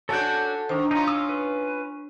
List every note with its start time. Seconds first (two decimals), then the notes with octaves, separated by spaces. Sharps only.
0.09 C#4 D4 F#4 A4 F#5 G6
0.69 D#3 D4 C5
0.91 C#4 D#4 F4
1.08 D#6 E6
1.29 B4